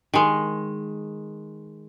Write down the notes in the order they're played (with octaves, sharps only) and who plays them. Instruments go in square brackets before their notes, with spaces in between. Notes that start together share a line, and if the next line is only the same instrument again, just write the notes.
[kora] D#3 G#3